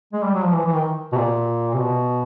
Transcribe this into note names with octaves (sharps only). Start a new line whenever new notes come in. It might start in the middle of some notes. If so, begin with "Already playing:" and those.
G#3
G3
F#3
F3
E3
E3
D#3
B2
A#2
C3
B2